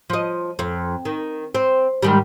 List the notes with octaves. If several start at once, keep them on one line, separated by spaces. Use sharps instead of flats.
F3 D#5
F2
D#3
C4
G#2 D#3 G3